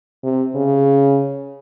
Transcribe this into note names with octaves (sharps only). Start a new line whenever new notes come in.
C3
C#3